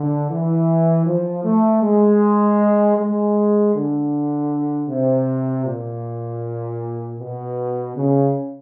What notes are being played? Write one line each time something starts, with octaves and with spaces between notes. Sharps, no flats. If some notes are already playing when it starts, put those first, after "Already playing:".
Already playing: D3
E3
F3
A3
G#3
G#3
D3
C3
A#2
B2
C#3